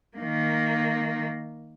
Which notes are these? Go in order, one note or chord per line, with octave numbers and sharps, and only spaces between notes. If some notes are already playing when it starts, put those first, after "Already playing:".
D#3 A#3